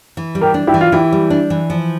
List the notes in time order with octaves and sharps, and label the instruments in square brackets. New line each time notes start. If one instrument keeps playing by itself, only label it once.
[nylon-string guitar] E3
G3
[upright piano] G4 A#4
[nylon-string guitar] D4
[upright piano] E4 G4
[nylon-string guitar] E3
[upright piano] F4
[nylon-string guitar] E3 [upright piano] E4 G4
[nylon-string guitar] G3
D4
E3
F3